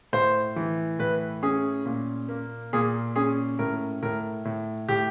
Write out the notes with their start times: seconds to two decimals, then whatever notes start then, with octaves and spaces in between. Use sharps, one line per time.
0.13 A2 C5
0.56 E3
0.99 A2 B4
1.43 C#4 G#4
1.86 A#2
2.29 A#3
2.73 A#2 G#4
3.16 C#4 G#4
3.59 A2 A#4
4.02 A2 A#4
4.45 A2
4.89 A2 G4